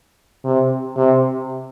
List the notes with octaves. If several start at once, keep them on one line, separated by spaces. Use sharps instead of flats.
C3
C3